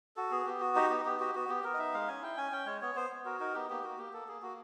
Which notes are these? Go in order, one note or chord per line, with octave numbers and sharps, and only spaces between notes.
F#4 A4
B3 G#4
B3 G4
F#4
D#4 G4
B3 G4
B3 G4
F#4 G4
B3 F#4
B3 G4
B3 A#4
D#5
D#4 E5
G#3 F5
C#4 G#5
E4 G5
C#4 G#5
C#4 G5
G#3 C#5
B3 C#5
B3 C5
B3
F#4 A#4
D#4 A#4
B3 G4
A#3 G4
A#3 F#4
A#3 G4
A#3 A4
A#3 G#4
A#3 F#4